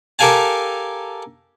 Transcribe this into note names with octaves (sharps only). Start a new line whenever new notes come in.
G4 A4 A#4 F5 G#5 A5